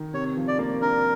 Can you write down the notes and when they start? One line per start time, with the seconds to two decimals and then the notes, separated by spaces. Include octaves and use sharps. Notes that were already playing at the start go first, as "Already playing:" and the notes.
Already playing: D#3
0.13 C3 C#5
0.37 F3
0.48 D5
0.59 A#3
0.81 D4 A#4